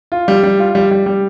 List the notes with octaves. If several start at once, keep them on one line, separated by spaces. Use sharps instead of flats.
F4
G3
G3
F4
G3
G3
G3